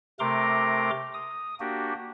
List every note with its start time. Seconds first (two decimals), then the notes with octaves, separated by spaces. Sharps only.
0.20 C3 A3 A#4 A#5 C6 D6
1.14 D#6
1.60 A#3 D4 F#4 G4